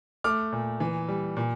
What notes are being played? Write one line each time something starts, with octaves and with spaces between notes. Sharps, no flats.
A3 D6 F6
A#2
E3
G3
A#2